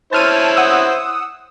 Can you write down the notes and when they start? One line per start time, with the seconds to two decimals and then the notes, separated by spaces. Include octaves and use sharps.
0.13 E4 C5 C#5 A5 F6 D#7
0.56 F#5 D#6 E6